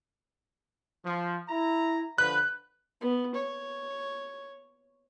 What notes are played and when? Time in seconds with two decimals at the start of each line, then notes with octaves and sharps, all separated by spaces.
1.05 F3
1.49 E4 A#5
2.18 D3 F3 B4 F#6
3.01 B3
3.34 C#5